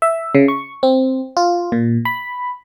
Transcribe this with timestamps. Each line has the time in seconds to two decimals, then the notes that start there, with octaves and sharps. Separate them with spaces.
0.02 E5
0.35 C#3
0.48 C#6
0.83 C4
1.37 F4
1.72 A#2
2.05 B5